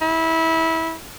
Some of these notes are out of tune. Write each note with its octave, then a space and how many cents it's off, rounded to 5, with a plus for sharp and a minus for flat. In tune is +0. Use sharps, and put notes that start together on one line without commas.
E4 -20